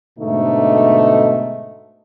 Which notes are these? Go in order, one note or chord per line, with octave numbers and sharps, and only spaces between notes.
G#2 B2 D3 A3 D#4